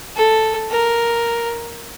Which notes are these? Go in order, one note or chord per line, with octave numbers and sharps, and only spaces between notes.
A4
A#4